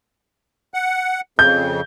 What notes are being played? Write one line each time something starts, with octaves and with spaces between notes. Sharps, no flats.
F#5
F2 C#3 G6